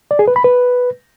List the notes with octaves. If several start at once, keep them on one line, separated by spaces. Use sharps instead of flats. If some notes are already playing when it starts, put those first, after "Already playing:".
D5
G#4
B4
B5
B4